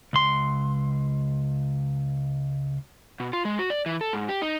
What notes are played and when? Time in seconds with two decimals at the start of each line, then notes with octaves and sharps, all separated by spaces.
0.13 C#2 C6
3.20 B2
3.33 F4
3.45 G#3
3.59 F#4
3.70 D5
3.86 E3
4.01 A4
4.13 G#2
4.29 G4
4.42 D#4